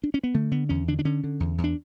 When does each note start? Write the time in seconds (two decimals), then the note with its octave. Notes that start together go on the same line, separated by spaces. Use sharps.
0.04 D4
0.14 C#4
0.23 B3
0.34 D3 A3
0.51 D3 B3
0.69 E2 C#4
0.88 D3 D4
0.99 D4
1.05 D3 C#4
1.24 D3
1.40 E2
1.58 E2
1.64 D4